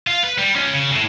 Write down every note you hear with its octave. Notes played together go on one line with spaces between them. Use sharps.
F4
B4
G3
C#4 F4
C#3
A2